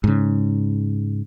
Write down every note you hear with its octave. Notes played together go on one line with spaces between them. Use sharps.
G#2 C#3